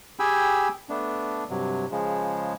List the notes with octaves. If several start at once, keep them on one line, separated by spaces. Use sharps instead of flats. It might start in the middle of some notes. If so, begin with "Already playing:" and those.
G4 G#4 G5 G#5 B5 E6
A3 B3 D4
G2 C3 F#3
C#3 F3 G#3